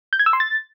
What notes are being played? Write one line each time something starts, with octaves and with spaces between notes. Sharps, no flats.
G6
G#6
E6
C6
A6